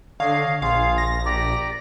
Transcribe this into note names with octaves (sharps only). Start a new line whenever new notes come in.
D3 C#5 D#5 F5
A#1 F4 G#4 F5
A#6
G4 D5 A#5